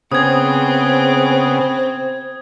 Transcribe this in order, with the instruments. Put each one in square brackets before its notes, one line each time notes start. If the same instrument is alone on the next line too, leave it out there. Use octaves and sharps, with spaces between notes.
[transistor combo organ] C#3 B3 G#4 [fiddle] C4 [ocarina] C5 [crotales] D#6 G#6